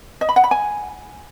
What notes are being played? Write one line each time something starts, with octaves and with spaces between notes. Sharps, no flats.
D#5
B5
F#5
B5
G#5